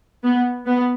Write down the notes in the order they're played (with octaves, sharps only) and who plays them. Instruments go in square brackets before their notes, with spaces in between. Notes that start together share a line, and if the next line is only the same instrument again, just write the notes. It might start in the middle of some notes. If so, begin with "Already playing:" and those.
[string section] B3
B3